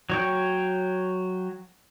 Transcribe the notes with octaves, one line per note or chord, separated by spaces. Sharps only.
F#3 C#5 G5